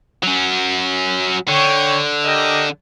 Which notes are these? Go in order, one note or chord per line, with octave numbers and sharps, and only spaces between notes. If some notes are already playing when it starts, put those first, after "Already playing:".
F#3 C#4
D3 C#5 G5
G4 A#4 D#5